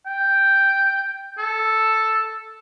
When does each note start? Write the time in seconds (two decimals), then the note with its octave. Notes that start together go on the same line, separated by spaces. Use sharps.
0.06 G5
1.38 A4